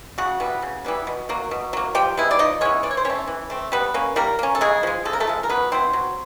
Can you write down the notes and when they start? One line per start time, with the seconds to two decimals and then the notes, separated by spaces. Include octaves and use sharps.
0.18 C#3 F#4 F#5
0.40 E3 G3 B3
0.62 C#3
0.85 E3 G3 B3
1.07 B2
1.29 F#3 A#3
1.51 B2
1.73 F#3 A#3
1.95 F3 G4 G5
2.17 G#3 B3 E4
2.31 D5
2.39 F3 D#4 D#5
2.61 G#3 B3 C#4 E4 C#5
2.83 E3 D5
2.91 C#5
2.97 C5
3.05 A3 C4 C#4 C#5
3.27 E3
3.50 A3 C4
3.72 G3 B3 B4
3.94 A#3 C#4
4.16 G3 A#3 A#4
4.39 A#3 C#4
4.55 A4
4.61 C#3 G#3 G#4
4.83 F3 G#3
5.05 C#3 A4
5.13 A#4
5.20 A3 A4
5.27 F3 G#3
5.43 A#4
5.49 F#3 B3 B4
5.72 B3 C4 E4 C5
5.93 F#3